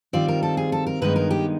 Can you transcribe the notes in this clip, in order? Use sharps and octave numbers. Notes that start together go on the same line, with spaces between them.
D#3 G3 C4 F4 D5
A#4
A4
G#4
A4
A#4
G2 D#3 G#3 B3 D#4 B4
A#4
G4